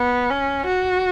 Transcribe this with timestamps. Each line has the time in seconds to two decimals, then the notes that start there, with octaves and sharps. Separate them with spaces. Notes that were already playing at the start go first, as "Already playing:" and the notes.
Already playing: B3
0.30 C#4
0.66 F#4